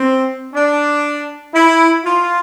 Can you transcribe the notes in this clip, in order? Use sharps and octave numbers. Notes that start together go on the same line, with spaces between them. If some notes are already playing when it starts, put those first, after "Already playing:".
Already playing: C4
D4
E4
F4